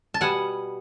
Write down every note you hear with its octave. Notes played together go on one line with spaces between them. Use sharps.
A5
B2 G3 B3 F#5 G#5